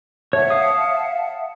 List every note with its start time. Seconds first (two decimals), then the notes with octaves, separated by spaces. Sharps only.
0.33 C#5 E5 F#5 A5
0.50 F5 D#6